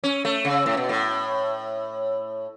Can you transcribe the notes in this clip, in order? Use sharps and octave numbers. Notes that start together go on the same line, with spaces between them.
C#4
A3
C#3
A2
B2
A2